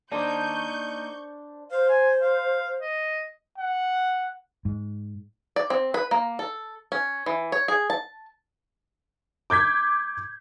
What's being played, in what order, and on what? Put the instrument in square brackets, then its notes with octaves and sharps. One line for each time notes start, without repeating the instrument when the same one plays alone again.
[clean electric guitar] A#3 D#4 [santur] D4 C5 [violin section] C#6 G6
[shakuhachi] C5 [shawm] F5
[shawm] G#5
F5
D#5
[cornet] F#5
[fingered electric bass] G#2
[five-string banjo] D5
C4
B4
A#3
A4
C#4
E3
C#5
G#4
A5
[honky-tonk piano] D6 G6 G#6 B6